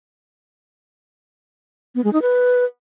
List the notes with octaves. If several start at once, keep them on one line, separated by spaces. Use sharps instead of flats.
B3
G#3
D#4
B4